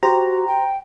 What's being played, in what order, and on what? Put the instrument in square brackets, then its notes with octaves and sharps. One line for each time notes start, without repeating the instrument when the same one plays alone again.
[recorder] F#4 [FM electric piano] G4 C5 A#5
[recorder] G5